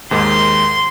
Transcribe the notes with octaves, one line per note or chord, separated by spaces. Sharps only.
D#2 G#2 D#3 C6